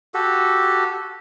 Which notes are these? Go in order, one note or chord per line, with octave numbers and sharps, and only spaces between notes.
F#4 G4 A4